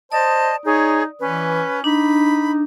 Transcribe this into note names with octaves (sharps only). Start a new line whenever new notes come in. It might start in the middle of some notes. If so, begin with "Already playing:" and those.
C5 D5 D#5 A5 D#6
D#4 G#4 C#5
E3 C#4 B4
D4 D#4 B5